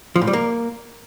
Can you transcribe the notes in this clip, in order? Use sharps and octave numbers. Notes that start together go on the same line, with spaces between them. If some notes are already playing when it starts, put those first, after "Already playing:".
F3
A2
G3
A#3